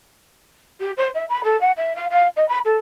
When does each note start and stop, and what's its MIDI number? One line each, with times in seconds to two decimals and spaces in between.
0.80 0.92 67
0.97 1.10 72
1.15 1.25 76
1.29 1.42 83
1.44 1.59 69
1.61 1.71 78
1.77 1.93 76
1.96 2.06 77
2.10 2.27 77
2.37 2.47 75
2.49 2.59 83
2.65 2.77 69